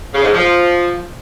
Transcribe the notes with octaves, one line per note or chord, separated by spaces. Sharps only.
C#3
G#2
F3